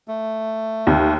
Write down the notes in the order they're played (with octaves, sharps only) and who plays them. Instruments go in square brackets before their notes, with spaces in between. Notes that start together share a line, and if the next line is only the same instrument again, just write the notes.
[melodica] A3
[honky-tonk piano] D#2